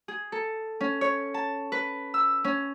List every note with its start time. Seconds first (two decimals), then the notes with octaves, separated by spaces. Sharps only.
0.08 G#4
0.32 A4
0.81 C#4
1.01 C#5
1.34 A5
1.72 B4
2.14 E6
2.44 C#4